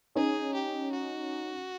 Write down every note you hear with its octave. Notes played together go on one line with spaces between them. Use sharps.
C#4 D#4 G#4
G4
F#4